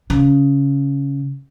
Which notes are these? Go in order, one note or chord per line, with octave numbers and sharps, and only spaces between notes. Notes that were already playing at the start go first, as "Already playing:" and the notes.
C#3